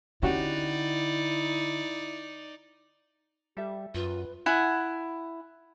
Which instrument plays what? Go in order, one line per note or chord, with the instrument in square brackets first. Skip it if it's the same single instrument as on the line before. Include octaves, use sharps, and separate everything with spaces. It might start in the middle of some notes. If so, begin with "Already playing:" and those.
[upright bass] D3 [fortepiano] C#4 F#4 G4 [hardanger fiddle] D#4 D5 [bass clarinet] E4
[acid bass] G3 [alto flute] G4 [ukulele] A4 E5
[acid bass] F#2 [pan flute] F4 [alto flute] B4
[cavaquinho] E4 F#5 G#5